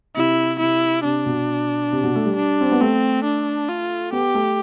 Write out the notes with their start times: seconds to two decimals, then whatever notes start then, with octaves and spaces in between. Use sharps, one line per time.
0.16 C3 E4
0.60 C3 E4
1.04 C3 D4
1.26 B2
1.93 C3
2.03 B2
2.15 A3
2.25 G3
2.36 D4
2.61 C4
2.72 B3
2.81 A3 C4
3.24 D4
3.69 F4
4.12 B3 G4
4.34 A3